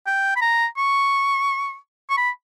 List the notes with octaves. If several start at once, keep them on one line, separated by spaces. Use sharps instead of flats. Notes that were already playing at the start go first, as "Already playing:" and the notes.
G5
B5
A#5
C#6
C#6
B5